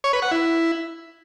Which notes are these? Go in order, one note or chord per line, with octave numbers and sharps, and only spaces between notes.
C#5
B4
F#5
E4